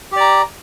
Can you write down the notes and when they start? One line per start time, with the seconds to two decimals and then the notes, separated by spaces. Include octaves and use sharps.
0.12 G4
0.16 D5
0.21 A#5